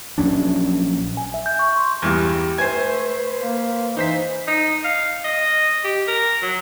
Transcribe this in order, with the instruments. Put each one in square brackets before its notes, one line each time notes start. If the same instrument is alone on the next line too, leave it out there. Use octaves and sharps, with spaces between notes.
[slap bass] A#1 F#3 C#4 D4
[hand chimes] G#5
E5
G6
C#6
C6
[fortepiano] E2 G2 [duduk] G4 [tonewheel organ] A#5
[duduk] A3 [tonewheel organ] B4 [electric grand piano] C5 G#6 [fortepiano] G#5
[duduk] A#3
[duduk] E3 [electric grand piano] D#4 C5 B6
[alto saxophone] D#4
F5
D#5
G4
A#4
F#3